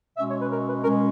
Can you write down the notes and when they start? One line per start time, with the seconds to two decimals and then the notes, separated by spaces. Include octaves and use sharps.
0.17 B2 G#3 C#4 E5
0.29 C#5
0.41 B4
0.51 A#4
0.68 B4
0.84 B2 G#3 C#4 A#4